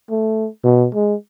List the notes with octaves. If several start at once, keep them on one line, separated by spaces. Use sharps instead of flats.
A3
B2
G#3